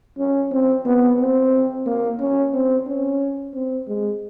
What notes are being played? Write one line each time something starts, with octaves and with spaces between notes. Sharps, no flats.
C#4
C4
B3
C4
A#3
C#4
C4
C#4
C4
G#3